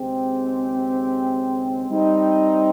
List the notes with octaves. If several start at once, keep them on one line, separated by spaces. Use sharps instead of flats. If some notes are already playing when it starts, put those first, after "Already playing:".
Already playing: D#2 C#3 G#3 C4 G4
G3 C4 D#4